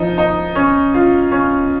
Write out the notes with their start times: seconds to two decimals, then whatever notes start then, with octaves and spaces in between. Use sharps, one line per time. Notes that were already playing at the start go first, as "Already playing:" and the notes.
Already playing: F3 D#4
0.18 D#4
0.55 C#4
0.94 F4
1.32 C#4